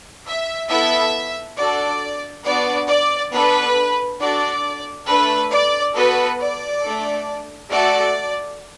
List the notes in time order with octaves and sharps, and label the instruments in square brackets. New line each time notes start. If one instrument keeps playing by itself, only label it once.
[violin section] E5
B3 E4 A4 E5
D4 F#4 A4 D5
B3 D4 F#4 D5
D5
B3 D4 A4 B4
D4 F#4 A4 D5
A3 D4 A4 B4
D5
B3 F#4 A4 B4
D5
A3 D4 A4
A3 F#4 A4 D5